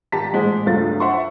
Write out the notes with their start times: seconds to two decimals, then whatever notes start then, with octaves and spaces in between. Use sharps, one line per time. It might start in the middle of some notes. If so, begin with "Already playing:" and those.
0.12 G#1 G4 A5 A#5 B6
0.32 A1 A#2 G#3 G#4 C5
0.66 C#2 G2 F#3 A3 F4 A6
1.00 C5 E5 F#5 C6 C#6